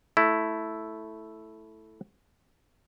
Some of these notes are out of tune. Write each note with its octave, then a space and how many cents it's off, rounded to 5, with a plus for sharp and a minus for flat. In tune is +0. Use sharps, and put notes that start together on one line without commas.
A3 +0 E4 +0